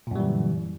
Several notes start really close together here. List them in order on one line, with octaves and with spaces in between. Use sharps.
A#2 F#2 G3 E3 D3